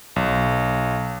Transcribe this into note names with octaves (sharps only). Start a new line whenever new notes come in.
B1